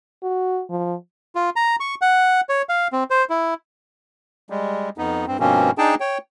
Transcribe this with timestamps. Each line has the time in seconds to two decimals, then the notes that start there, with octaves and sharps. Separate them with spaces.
0.23 F#4
0.70 F3
1.35 F4
1.56 A#5
1.80 C#6
2.02 F#5
2.49 C#5
2.69 F5
2.93 C4
3.10 C5
3.30 E4
4.50 G3 G#3
4.98 F2 B3 D#4
5.27 G2 C4
5.40 G2 B2 F3 A#3 C4 C#4
5.78 D4 D#4 G#4 G5 A5
6.00 C#5 G5